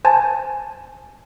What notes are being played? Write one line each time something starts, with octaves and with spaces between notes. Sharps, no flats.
C5 G#5 A5 A6